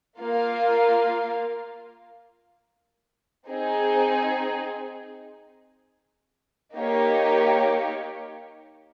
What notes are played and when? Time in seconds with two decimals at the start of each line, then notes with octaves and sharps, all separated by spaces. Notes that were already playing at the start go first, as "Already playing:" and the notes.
0.19 A#3 F4 A#4 F5
3.48 C4 D#4 G#4
6.76 A#3 D#4 G4 C#5